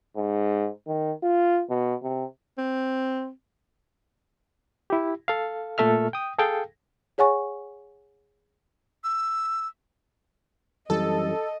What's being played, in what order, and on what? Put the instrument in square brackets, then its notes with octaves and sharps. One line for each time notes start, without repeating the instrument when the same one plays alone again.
[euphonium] G#2
D#3
F4
B2
C3
[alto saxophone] C4
[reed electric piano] E4 G4
A4 F5
A#2 A3 A4 E5 F6
G5 D#6
G#4 A4 F5 G5
[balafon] G#4 C#5 F#5 G#5 C#6
[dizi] E6
[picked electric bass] F#2 E3 G3 [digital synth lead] A4 [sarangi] D#5